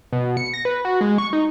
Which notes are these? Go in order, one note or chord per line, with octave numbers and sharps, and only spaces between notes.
B2
C#7
A#6
B4
F#4
G#3
C#6
D#4